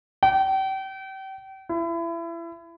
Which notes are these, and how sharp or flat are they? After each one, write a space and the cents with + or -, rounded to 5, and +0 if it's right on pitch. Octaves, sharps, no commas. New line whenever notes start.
G5 -35
E4 +30